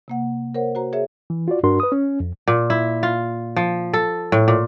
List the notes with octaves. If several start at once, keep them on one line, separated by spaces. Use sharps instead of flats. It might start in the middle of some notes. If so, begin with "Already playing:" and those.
C3 A#3 F#5
A#4 C5 C#5 F#5
F#4 C5 A#5
G#4 C#5 E5
E3
F4 F#4 D5
G2 D4 F#4 A#4 C6
B4 D#6
C#4
F2
A#2
E4
F4
F3
A4
A2
A#2